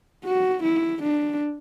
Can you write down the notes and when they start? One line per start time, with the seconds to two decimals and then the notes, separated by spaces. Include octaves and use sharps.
0.24 F#4
0.63 E4
1.03 D4